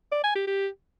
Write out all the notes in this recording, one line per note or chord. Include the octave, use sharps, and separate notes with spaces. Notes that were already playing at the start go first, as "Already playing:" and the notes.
D5
G#5
G4
G4